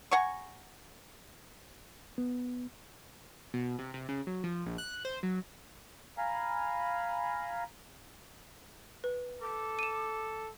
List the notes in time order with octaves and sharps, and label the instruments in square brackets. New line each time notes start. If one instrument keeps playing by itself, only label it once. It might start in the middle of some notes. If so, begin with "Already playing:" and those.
[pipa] F#5 G#5 A#5 C#6
[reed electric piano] B3
[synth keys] B2
C3
C3
C#3
F#3
F3
A#1
F#6
C5
F#3
[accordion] F5 G#5 A#5 B5
[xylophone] B4
[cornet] A4 [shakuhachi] D6
[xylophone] D#7 E7